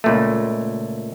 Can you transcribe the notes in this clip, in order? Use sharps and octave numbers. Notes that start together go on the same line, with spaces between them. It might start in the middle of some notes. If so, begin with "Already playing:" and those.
C#2 A#2 A3